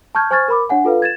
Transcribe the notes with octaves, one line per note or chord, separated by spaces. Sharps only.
A5 C#6 F6 G6 G#6
C5 G#5 C#6 F6 G#6 A6
A#4 B5 D6
D4 C#5 F#5 G#5
F4 A4 B4 F5
G#6 A6 E7